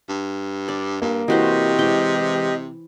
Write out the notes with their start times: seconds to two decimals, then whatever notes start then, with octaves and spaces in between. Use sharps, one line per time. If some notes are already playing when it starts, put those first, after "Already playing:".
0.09 G2
0.68 D5
1.02 G2 A#3
1.28 C3 E3 F#4 G4 C5 D#5
1.79 E3 G#3 G5